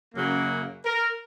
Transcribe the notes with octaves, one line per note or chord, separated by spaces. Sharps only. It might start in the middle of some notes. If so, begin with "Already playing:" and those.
F#2 C#3 F#3 A#3
A#4